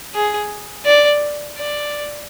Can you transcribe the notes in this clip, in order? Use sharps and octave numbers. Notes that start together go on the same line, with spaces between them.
G#4
D5
D5